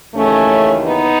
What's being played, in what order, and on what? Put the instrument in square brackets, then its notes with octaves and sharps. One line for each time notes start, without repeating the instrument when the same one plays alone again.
[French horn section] D#2 C#3 E3 A3 C#4
B3 D#4